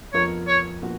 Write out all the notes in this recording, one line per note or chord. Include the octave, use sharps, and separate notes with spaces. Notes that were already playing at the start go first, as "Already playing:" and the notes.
F2 F3 B3 F4 A#4 C#5
C#5
A#2 F3 B3 F#4